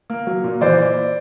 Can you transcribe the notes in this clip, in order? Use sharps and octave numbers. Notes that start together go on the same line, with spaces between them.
A#3
F#3
A#2
E3 C5 D5